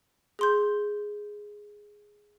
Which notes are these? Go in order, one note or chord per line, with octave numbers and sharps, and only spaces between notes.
G#4 C6 G6